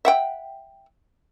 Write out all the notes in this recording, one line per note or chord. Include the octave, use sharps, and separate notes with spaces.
E5 F#5 G5